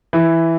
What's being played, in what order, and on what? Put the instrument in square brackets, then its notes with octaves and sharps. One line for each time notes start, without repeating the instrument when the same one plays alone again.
[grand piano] E3